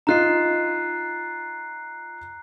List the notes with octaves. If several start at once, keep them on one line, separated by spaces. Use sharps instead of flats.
D#4 F4 D#5 A#5 F#6 C7